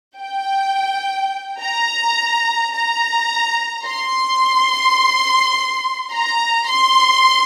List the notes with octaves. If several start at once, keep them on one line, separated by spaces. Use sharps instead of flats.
G5
A#5
A#5
C6
A#5
C6